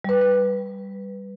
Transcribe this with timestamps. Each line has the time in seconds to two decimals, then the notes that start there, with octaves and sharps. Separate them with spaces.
0.04 G3 B4
0.21 B4